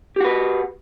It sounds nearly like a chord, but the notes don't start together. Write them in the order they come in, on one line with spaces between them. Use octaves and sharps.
G4 F#4 B4